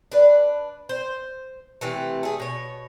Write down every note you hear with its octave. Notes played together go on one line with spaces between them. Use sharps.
D4 B4
C5
C3 E3 A3
A3 G#4
B2 C#5